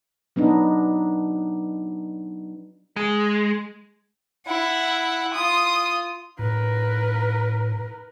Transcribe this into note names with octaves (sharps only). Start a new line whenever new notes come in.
F#3 B3 D4 D#4
G#3
E4 F#5
F4 D#6
A2 A#4 B4